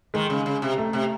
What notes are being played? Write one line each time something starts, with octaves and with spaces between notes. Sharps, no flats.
D#3 G#3
C#3
C#3
C3
A3
C3